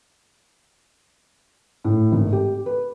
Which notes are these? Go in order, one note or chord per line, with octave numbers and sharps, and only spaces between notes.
A2
G#1
G4
B4